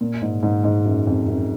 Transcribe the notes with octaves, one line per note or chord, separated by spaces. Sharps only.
A#2
G#2
G#2
G#2
F#2
F2
F#2